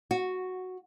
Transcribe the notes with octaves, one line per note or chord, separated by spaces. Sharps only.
F#4